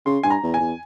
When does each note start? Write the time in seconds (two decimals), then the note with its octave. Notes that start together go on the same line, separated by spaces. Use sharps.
0.06 C#3 C6
0.23 G2 G#5
0.30 A#5
0.43 E2
0.54 G#5
0.60 E2